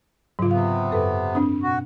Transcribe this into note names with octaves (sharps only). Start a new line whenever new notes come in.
G#2 C#3 F#3 F4
C3 B3 F5
F#2 A4 B4
C4 D4 D#6
B2 F#4